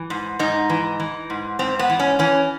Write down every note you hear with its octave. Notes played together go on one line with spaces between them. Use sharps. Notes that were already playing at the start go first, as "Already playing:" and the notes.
Already playing: E3
G#2
G#2 D#4
E3
E3
G#2
G#2 C4
B3
E3
C#4
E3 C#4